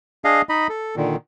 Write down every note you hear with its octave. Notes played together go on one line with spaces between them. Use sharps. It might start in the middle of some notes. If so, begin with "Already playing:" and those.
D4 G#4 D#5 F5
D#4 D#5 B5
A4
A#2 D3 D#3